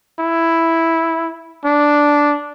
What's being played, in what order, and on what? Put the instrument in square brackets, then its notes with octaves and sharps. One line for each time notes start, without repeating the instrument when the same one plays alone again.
[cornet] E4
D4